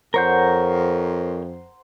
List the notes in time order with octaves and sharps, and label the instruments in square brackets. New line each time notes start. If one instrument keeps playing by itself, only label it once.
[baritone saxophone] F2 [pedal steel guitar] A#4 C#5 G6 [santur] C5 F#5 A#5